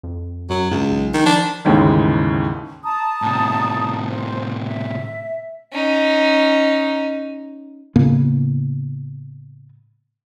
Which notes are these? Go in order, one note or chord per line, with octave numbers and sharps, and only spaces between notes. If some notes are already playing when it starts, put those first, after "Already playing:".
F2
F#2 F#3
C#2 G2
B1
D#3
F3 D4
G1 D#2 G#2 C#3 E3
A5 A#5 D#6
A2 C3
C5
E5
C#4 D#4
A2 C#3 A#3 B3